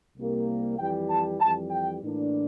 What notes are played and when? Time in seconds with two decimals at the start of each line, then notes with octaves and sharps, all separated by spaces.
0.17 C2 C3 G3 A#3
0.78 F2 E3 G3 G5
1.09 A5
1.40 F2 E3 G3 A5
1.71 G5
2.02 A2 E3 A#3 D4